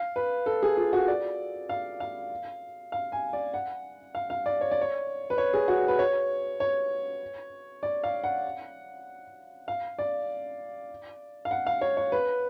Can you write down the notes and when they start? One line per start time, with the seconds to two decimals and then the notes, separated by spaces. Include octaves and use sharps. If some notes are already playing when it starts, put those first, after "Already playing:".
Already playing: F5
0.16 B4
0.46 A4
0.63 G#4
0.77 F4
0.93 F#4
1.08 D5
1.69 F5
2.00 F5
2.92 F5
3.12 G#5
3.33 D5
3.54 F#5
4.15 F5
4.30 F5
4.46 D5
4.61 C#5
4.71 D5
4.81 C#5
5.30 B4
5.38 C#5
5.53 G#4
5.68 F#4
5.88 B4
5.99 C#5
6.60 C#5
7.83 D5
8.04 F5
8.24 F#5
9.68 F5
9.99 D5
11.45 F5
11.51 F#5
11.67 F5
11.81 C#5
11.97 C#5
12.12 B4